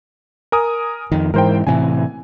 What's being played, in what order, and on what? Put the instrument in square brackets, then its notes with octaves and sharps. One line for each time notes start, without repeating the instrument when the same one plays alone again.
[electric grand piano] A#4 G#5 D#6
[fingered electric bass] F2 D#3
[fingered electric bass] G#2 E3 [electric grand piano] A#4 C5 G5
[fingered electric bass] A2 C3 E3 [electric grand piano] G#5